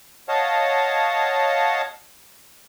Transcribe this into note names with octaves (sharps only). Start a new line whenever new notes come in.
C#5 D#5 F5 F#5 A5